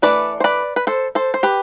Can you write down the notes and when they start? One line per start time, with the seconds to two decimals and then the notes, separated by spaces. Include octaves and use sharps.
0.02 E3 A3 D4 B4 D5
0.40 C5
0.44 B4 D5
0.76 B4
0.87 A4 C5
1.15 A4 C5
1.34 C5
1.43 G4 B4